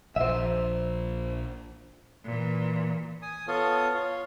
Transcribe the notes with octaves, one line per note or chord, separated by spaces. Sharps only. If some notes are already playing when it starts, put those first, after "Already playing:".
A#1 F3 C5 E5
A#2 E3
G#5 D#6
B3 F4 A4 C#5 D#6
F4 C#5